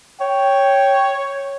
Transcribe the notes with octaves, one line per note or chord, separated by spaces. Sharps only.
C#5 G5